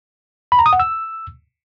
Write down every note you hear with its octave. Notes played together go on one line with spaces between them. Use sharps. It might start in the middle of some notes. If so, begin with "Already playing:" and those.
B5
A#5
D#6
F#5
E6